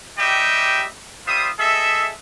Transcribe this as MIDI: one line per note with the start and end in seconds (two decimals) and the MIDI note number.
0.18 0.86 55
0.18 0.86 56
0.18 0.86 67
0.18 0.86 75
0.18 0.86 76
0.18 0.86 79
1.26 1.49 55
1.26 1.49 65
1.26 1.49 72
1.26 1.49 76
1.26 1.49 87
1.59 2.11 68
1.59 2.11 69
1.59 2.11 75
1.59 2.11 76